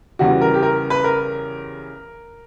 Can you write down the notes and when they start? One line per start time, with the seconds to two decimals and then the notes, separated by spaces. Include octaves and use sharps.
0.19 E2 C#3 E3 G3 F#4
0.42 A#4
0.54 G4
0.63 A#4
0.90 B4
1.04 A#4